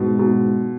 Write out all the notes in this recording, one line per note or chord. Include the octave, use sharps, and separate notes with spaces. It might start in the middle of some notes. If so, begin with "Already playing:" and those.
Already playing: G#2 B2
B2